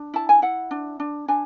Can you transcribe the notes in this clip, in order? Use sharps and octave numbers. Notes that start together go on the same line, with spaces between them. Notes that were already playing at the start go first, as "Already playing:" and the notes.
Already playing: D4
E4 A5
G#5
E4 F#5
D4
D4
D4 G#5